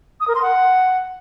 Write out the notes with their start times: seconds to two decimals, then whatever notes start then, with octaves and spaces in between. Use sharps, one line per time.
0.20 D#6
0.28 A#4
0.35 C6
0.42 F#5